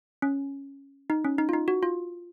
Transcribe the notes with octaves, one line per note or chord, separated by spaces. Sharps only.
C#4
D#4
C#4
D#4
F4
D#4
F#4
F4